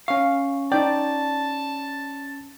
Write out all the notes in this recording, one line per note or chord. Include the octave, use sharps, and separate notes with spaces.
C#4 F5 C#6
D#4 D5 G5 A5